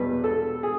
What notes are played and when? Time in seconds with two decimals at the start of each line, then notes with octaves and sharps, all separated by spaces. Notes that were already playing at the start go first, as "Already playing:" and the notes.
Already playing: E2 B2 G3 B4
0.24 A4
0.63 G#4